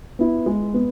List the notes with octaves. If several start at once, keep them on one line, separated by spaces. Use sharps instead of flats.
B3 E4
G#3
B3